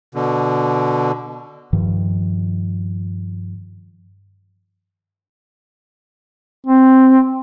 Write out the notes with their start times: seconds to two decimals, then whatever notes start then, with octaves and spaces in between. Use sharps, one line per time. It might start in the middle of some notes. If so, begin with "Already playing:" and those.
0.15 B2 D3
1.73 G2 D#3 F3
6.66 C4